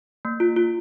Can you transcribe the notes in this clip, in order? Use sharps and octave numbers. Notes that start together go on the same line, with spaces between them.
A#3
F4
F4